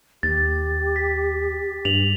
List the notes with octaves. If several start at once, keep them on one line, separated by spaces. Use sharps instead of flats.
D#2 G4 A6
B6
G2 F7 F#7